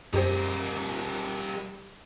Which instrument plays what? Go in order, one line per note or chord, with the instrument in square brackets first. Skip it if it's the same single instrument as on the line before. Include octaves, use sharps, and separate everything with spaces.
[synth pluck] F#2 G4 C5 [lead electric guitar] G3 A#4